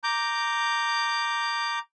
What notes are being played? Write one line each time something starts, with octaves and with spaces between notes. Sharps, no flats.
A#5 D6 G6